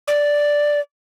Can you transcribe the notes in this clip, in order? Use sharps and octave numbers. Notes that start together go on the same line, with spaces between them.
D5